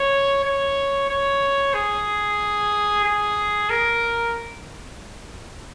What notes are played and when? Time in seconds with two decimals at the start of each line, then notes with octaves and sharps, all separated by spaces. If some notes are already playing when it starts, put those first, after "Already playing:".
Already playing: C#5
0.44 C#5
1.09 C#5
1.74 G#4
3.05 G#4
3.70 A#4